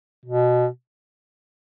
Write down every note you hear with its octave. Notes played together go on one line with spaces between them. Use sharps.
B2